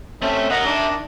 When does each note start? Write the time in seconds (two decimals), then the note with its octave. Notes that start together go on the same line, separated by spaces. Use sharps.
0.22 A3 C4 C#4 E5
0.50 A#4 D#5 E5 F#5 A#5
0.65 D#3 D4